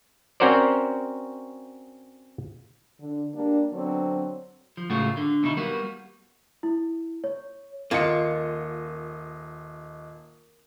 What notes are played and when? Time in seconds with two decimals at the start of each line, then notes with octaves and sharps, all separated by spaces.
0.40 C4 C#4 F#4 A#4 C5 D5
3.00 D3
3.34 G3 A#3 D4
3.72 D3 F#3 B3 C4
4.77 F3
4.90 A2 C#3 G#3 A3 F4 F#4
5.17 D3
5.43 D#2 B2 D#4 E4
5.57 G3 A#3 B3 F#4
6.63 E4
7.24 C#5
7.91 D#1 A#3 F4 D#5 C#7